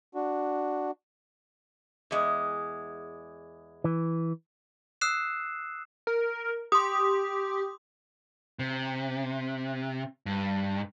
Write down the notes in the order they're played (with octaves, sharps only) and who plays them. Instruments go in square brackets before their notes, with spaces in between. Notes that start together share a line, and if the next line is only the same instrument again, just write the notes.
[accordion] D4 F#4
[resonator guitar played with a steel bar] E2 G#3
[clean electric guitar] E3
[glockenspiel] D#6 E6 F#6 C7 E7
[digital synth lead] A#4
[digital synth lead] G4 [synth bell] C6 D#6
[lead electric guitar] C3
G2